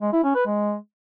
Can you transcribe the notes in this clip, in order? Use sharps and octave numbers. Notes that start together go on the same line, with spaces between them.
G#3
E4
C#4
B4
G#3